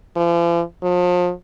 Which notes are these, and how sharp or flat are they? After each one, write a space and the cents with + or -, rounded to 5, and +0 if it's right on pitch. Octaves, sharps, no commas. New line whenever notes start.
F3 -45
F3 +35